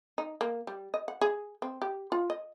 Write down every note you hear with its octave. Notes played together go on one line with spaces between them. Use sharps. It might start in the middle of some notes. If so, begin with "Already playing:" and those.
D#4
A#3
G3
D#5
F#5
G#4
C4
G4
F4
D#5